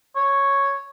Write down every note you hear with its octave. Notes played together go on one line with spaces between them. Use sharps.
C#5